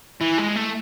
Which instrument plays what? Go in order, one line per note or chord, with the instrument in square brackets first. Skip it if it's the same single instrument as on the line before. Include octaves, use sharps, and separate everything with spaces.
[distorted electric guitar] E3
G#3
A3